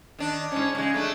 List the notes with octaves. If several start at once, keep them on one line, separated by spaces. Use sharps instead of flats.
D#3 D4
G#2 C#4
C#3 G#3
A3 D4